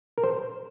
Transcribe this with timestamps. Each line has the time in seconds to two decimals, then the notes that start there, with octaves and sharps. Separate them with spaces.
0.18 A#4
0.24 C5